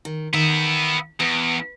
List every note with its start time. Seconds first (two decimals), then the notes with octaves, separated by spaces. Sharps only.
0.05 D#3
0.33 D#3 B3 E5
1.20 E2 B4